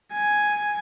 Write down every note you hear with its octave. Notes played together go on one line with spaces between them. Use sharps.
G#5